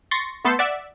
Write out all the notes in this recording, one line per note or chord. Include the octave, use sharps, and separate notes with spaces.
C6 C#6 A6 A#6
A3 B3 A4 C6 G6 B6
D5 E5 F#5